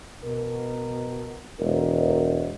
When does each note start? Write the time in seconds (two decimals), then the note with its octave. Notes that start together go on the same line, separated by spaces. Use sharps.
0.23 B2 A#4
1.60 E1 A#4